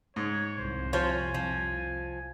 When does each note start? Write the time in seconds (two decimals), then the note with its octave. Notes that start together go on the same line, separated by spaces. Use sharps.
0.16 G#2 C#5
0.58 C2 F2 C5
0.93 F3 F4 C5 C#5 G#5
1.34 F3